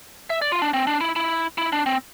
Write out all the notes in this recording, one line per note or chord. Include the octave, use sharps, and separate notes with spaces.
E5
D5
F4
D4
C4
D4
E4
E4
E4
D4
C4